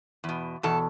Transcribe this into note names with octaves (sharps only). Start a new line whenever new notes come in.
E2 B2
E2 B2 A4